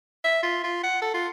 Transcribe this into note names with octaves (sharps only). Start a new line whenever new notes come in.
E5
F4
F4
F#5
A4
F4